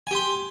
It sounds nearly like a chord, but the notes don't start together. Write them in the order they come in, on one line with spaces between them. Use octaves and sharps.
G#5 G4 C6